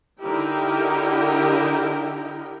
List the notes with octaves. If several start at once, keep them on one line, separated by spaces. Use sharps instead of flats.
D3 D#4 E4 G4 A#4 G5